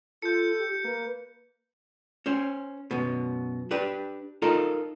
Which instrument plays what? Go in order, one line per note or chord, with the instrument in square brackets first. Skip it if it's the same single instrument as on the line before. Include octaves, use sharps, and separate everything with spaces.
[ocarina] F4 [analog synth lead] A4 [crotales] G6 C#7
[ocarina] G4
[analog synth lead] A#3 [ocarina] B4
[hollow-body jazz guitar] C#4 C5
F#2 B2
D4 G4 B4
D#4 F4 A4 A#4